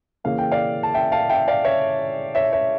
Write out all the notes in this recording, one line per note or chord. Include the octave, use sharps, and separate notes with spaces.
C#3 E3 A#3 C#4 F5
G5
D5 F5
A5
E5 G5
F5 A5
E5 G5
D5 F5
C#5 E5
C#5 E5
C#5 E5